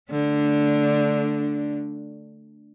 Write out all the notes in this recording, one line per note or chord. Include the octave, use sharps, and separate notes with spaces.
D3 A3 D4